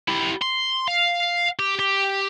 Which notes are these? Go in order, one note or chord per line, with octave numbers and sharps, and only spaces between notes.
E4 G4
C6
F5
G4
G4